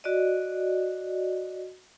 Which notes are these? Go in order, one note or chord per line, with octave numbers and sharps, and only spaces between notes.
F#4 D5 D#5